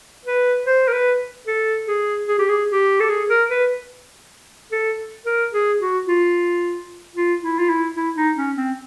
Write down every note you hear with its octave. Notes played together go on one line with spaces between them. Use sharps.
B4
C5
A#4
B4
A4
G#4
G#4
G4
G#4
G4
A4
G#4
A#4
B4
A4
A#4
G#4
F#4
F4
F4
E4
F4
E4
E4
D#4
C#4
C4